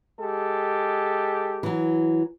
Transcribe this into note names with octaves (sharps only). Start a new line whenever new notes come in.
G#3 G4 A4
E3 F#3